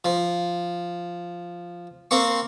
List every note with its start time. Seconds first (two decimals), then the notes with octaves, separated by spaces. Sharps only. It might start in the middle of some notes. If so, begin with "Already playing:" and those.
0.05 F3
2.11 A#3 C4 C#6